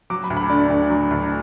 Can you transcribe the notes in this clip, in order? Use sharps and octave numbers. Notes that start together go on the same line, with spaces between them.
F#3 D6
B5
D2
B5
D3 D5
D2
F#3
D2